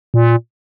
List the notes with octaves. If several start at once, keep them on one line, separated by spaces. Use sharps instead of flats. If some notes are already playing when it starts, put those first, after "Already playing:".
A#2